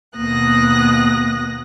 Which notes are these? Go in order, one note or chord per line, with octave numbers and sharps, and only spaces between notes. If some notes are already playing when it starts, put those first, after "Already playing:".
D#2 B2 A#3 D#6 F#6 A#6